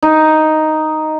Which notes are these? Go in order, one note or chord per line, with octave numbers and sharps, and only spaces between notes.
D#4